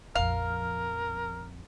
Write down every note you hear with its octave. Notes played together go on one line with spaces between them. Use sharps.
A#1 F2 A#4 F5